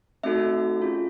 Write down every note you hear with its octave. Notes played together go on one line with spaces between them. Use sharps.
A3 C4 D#4 F#4 A4 E5
C#4 F4 G#4